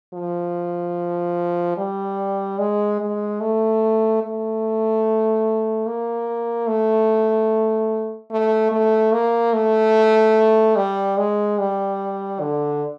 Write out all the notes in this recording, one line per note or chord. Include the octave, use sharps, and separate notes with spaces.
F3
G3
G#3
G#3
A3
A3
A#3
A3
A3
A3
A#3
A3
G3
G#3
G3
D3